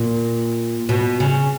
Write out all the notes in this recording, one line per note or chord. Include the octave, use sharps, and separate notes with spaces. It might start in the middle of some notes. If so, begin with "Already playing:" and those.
Already playing: A#2
B2
C#3